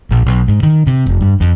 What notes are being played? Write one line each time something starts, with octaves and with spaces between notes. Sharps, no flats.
A#1
B1
G#2
D#3
C3
F1
G2
F2